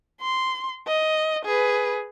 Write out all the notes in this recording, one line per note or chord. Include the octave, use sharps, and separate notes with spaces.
C6
D#5
G#4 B4